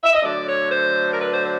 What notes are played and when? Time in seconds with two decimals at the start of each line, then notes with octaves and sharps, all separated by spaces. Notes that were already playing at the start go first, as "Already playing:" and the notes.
0.04 E5
0.13 D#5
0.23 D3 F#3 A3 D5
0.47 C#5
0.71 C5
1.12 A#4
1.19 B4
1.31 C5
1.43 C5